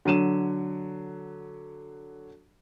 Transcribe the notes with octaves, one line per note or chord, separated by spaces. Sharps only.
D3 F#3 D#7 E7